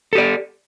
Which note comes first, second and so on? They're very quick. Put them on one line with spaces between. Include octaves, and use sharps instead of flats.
A4 G4 D5